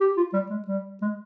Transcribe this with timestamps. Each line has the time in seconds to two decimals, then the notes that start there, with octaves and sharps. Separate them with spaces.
0.01 G4
0.17 F4
0.33 G3
0.50 G#3
0.68 G3
1.02 G#3